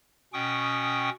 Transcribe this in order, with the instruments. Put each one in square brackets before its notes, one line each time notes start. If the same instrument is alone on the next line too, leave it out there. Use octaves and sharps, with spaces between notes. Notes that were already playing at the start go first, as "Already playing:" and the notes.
[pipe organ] B2 C#4 G5 C#6 D#6